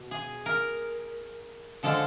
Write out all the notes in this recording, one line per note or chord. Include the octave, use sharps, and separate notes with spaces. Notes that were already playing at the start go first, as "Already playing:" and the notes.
Already playing: B2
G#4
A#4
D3 F3 G#3 A4